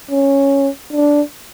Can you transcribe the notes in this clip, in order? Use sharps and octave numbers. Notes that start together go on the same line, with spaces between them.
C#4
D4